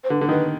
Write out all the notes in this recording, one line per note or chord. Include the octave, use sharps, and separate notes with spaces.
C5
D3 B4
D3
D#3 B4